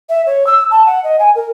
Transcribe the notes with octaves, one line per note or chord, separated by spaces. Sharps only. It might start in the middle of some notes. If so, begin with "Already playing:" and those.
E5
C#5
E6
A5
F#5
D#5
G#5
A#4